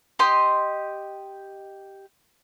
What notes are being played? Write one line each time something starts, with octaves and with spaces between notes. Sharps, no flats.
G4 D#5 C6